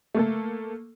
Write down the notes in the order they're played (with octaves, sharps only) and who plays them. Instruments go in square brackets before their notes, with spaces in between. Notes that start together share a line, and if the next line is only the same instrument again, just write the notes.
[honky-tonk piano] A3 A#3 A4